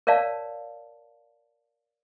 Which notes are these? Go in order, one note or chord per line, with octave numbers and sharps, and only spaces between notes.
A#4 C#5 D5 F5 A5